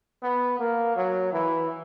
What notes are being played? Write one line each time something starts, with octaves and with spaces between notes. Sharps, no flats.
B3
A#3
F#3
E3